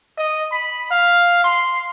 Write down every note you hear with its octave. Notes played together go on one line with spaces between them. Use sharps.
D#5
B5
F5
C6